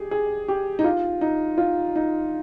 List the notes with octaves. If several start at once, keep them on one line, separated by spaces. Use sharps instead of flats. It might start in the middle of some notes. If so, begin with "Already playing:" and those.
Already playing: G4 G#4
G#4
G4
D#4
F4
D#4
F4
D#4